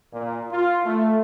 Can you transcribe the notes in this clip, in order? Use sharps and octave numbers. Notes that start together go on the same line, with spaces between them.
A#2
F4
A3